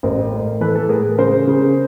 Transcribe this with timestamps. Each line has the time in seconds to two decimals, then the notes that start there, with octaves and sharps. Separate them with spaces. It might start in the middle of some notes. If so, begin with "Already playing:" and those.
0.03 A1 A#4 C5
0.33 A2
0.61 E3 A4 B4
0.74 A4 B4
0.89 A2 G#4 A#4
1.18 C#3 A#4 C5
1.47 C#3